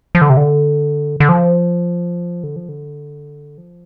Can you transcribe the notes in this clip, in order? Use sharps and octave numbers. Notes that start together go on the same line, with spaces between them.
F3
D3
C3
D3
D3
F3
D3
F3
D3
F3